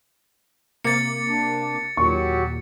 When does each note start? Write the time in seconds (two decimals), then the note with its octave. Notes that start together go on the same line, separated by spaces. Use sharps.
0.84 C3 A#3 D6 A6 C#7
1.28 D4
1.97 D#2 A#2 F#3 F#4 G4 C#6